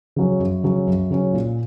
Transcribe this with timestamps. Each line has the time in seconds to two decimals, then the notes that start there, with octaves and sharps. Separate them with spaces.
0.16 C#3 F#3 C#4
0.40 F#2
0.64 C#3 F#3 C#4
0.87 F#2
1.11 C#3 F#3 C#4
1.34 A#2